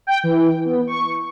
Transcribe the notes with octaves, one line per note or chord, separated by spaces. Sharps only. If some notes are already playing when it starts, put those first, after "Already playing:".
G5
E3
B3
C#6